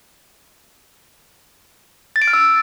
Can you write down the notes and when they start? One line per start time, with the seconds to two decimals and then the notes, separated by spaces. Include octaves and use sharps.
2.16 A6
2.22 D7
2.28 F6
2.33 E6